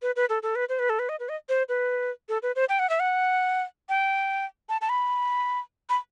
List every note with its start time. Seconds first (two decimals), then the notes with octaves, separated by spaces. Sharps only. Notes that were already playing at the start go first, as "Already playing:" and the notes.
0.02 B4
0.16 B4
0.29 A4
0.43 A4
0.55 B4
0.69 C5
0.79 B4
0.90 A4
0.99 B4
1.09 D#5
1.20 B4
1.29 D#5
1.49 C5
1.69 B4
2.29 A4
2.43 B4
2.56 C5
2.69 G5
2.79 F#5
2.90 E5
3.00 F#5
3.89 G5
4.69 A5
4.81 A5
4.89 B5
5.90 B5